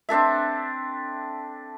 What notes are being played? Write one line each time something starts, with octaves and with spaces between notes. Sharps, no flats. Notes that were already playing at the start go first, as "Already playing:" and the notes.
C4 D4 A4 E5